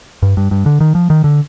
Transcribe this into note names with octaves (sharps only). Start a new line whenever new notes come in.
G2
G2
G2
D3
D#3
F3
D#3
D3